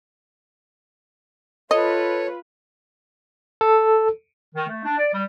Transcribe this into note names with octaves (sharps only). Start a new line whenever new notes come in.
F4 A4 B4 C#5 D#5
A4
D#3
A3
D4
D5
G3